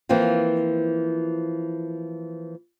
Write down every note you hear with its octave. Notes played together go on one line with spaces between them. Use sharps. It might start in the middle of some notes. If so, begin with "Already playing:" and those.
E3 F3 A#3 C4 F4